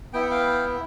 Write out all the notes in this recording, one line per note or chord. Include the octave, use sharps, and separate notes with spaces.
B3 E4 G5
F#5
F5 G5